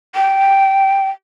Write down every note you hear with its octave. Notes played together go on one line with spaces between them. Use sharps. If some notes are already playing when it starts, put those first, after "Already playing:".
G5